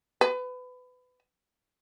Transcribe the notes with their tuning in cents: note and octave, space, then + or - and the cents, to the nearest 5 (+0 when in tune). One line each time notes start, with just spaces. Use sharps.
B4 +25